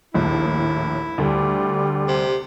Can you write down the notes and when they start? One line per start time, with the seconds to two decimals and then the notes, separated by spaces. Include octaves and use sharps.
0.14 A#1 D#2 A2 E4
1.18 D2 G3 A3
2.08 C3